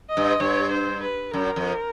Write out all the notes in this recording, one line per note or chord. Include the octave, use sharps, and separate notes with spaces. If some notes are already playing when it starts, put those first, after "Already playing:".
D#5
G2
G2 C#5
C5
B4
F#2 A#4
F2